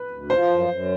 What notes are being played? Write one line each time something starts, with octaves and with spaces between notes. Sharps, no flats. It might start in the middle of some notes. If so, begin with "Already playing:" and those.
Already playing: B4
D2
F3 C5
F#2
F#2